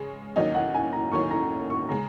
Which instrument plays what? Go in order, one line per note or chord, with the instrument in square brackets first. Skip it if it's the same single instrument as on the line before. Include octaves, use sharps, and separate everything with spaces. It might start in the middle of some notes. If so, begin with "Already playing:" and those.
Already playing: [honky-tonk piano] C#3 G#3 C#4
[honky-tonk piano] D#2 D#3 F#3 C#4 [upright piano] D#5
[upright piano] F#5
G#5
A#5
[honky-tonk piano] D#2 D#3 F#3 C#4 [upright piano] C#6
[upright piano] A#5
C#6
[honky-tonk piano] C#3 G#3 [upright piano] A#5